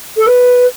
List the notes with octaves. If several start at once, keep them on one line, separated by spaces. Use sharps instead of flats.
A4
B4